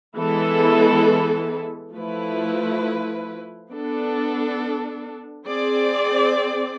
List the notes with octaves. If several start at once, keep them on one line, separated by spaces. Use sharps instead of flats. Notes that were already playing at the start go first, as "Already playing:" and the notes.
E3 G#3 B3 E4 A4
F3 A3 E4 B4
B3 D4 A4
C4 G#4 D5